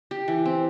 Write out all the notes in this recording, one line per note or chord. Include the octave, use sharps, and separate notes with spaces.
G4
E3
C4